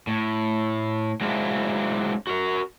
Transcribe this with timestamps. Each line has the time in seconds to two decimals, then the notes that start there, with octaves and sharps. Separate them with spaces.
0.07 A2
1.21 F#3 G#3 C4 D4 E4 F4
2.27 F#4 A#4